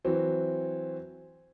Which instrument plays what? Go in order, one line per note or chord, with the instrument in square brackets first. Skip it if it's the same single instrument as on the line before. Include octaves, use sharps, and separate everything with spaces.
[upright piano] E3 F#3 C4 F#4